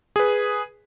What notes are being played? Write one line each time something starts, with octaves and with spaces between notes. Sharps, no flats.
G#4 B4